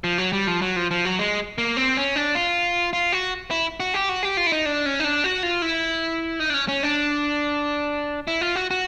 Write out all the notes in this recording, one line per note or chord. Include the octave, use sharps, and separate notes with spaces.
F3
F#3
G3
F3
F#3
F3
F3
F#3
G#3
A#3
C4
C#4
D4
F4
F4
F#4
E4
F#4
G4
F#4
G4
F4
E4
D#4
D4
C#4
D#4
D4
F#4
F4
E4
D#4
D4
C#4
C#4
D4
E4
F4
F#4
F#4